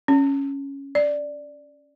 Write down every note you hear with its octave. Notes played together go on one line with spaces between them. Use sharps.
C#4
D5